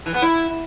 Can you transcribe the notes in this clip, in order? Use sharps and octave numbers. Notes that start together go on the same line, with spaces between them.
E3
B3
E4